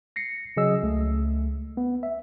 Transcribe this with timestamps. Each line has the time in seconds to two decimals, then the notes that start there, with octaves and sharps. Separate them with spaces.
0.16 A#6 C7 C#7
0.57 C#3 F#3 G#4 D#5 E6
0.83 C#2 A3
1.77 B3
2.03 E5